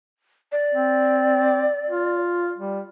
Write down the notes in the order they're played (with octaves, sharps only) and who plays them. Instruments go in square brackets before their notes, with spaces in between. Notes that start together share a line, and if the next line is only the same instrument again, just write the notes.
[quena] D5
[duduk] C4
F4
G3